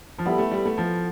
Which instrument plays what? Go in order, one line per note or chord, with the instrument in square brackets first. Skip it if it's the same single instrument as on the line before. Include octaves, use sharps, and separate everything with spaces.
[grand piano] F3
[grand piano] G3 [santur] B3 E4 A4
[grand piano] A3
G3
A3
F3